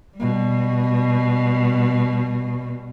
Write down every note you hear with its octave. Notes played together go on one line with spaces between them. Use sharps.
B2 G3